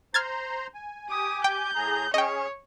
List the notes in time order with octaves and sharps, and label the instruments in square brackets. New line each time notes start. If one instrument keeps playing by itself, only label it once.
[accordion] C5 A#5 C6 [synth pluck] F6 G#6 A6
[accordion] G#5
[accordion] G4 G#5 D6 [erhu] D#6
[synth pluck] G5 [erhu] G6
[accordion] A2 G#4 A#5
[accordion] C#4 G#4 [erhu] C#5 [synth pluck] D#5 G5